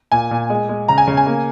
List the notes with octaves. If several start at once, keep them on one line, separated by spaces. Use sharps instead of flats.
A#2 G#5
A#2
G#3
G#3
C#3 A#5
G#5
C#3
G#5
A#3